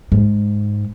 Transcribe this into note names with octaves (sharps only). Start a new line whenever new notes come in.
G#2